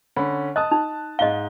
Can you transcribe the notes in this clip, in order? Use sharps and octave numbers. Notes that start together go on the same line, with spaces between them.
D3 C#4 B5
D#5 A5 D#6 F#6
D#4
G#2 D#5 F5 G7